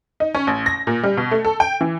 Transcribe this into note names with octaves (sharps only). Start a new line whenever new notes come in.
D#4
C#4
A1
A#6
A#2
G3
B2
A3
A4
G5
E3